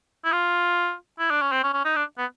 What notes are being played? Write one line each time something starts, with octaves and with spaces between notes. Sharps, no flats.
E4
F4
E4
D4
C#4
C4
C#4
C#4
D#4
D4
B3